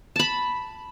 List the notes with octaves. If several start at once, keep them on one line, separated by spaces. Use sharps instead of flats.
A5 B5